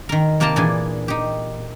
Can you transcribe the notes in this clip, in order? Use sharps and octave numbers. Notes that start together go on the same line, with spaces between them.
D#3 A#4
C3 A#3 A#4 G5 A5 A#5
A#2 E3 D4 G#4
D#4 G4